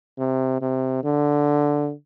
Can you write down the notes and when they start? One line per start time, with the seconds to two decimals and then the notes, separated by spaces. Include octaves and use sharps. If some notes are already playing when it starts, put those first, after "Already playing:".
0.18 C3
0.61 C3
1.03 D3